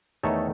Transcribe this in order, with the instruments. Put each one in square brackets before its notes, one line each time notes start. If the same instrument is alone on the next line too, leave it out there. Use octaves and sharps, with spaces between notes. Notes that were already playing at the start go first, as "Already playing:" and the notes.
[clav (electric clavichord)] E2 D#3 A3 D#4 A4 C#5